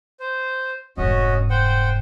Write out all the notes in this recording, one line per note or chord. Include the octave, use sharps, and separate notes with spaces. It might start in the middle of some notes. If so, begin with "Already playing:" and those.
C5
F1 G#2 C#4 F#4 D#5
C5 F#5 G5